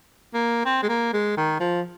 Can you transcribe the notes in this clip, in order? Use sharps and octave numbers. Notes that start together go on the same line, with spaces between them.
A#3
C4
G#3
A#3
G#3
D#3
F3